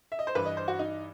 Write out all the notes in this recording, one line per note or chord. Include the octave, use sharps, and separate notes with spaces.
E5
D#5
C5
G2 E3 B4
D#5
C5
F#4
D#4